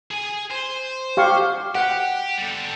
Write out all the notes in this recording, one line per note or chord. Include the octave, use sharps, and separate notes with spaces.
G#4 G#5
C5
G4 F5 C#6
G4 F#5
G3 A4